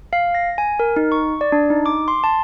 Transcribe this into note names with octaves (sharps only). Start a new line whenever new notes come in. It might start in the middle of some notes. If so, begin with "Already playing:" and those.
F5
A#6
G#5
A#4
D#4
C#6
D5
D4
D#4
D6
C6
A5